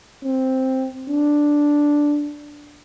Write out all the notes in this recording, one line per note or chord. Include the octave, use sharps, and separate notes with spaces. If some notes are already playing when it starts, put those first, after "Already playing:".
C4
D4